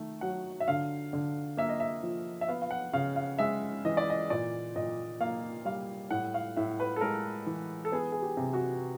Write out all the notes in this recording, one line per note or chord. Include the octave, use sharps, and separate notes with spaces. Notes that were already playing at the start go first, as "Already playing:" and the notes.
Already playing: D#3 A3
F#3 F#5
E5
D3 F5
D3
A#3 E5
D#5
E5
F3
E5
B3 F5
F5
F#5
C#3 F5
F5
G#3 E5
E3 D#5
D5
D#5
A#2 D5
A#2 D#5
A#3 F5
G3 F5
A2 F#5
F5
A2 E5
B4
A4
G#3 A#4
E3
A4
B3 G#4
G#4
G4
C3
F#4